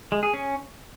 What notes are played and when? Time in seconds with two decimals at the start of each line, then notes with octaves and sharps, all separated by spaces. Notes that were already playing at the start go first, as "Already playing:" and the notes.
0.12 G#3
0.23 G#4
0.34 C#4